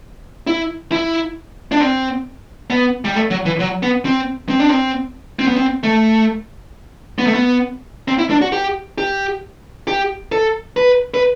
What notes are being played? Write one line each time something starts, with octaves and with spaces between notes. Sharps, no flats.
E4
E4
D4
C4
B3
G3
A3
F#3
E3
F#3
B3
C4
C4
D4
C4
C4
B3
C4
A3
B3
A3
B3
C4
E4
D4
F#4
G4
G4
G4
A4
B4
B4